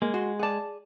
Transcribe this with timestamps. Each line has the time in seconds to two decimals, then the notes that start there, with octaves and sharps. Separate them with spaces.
0.02 G#3 A#3
0.14 F#4 C6
0.39 G#4 D5 F#5 A5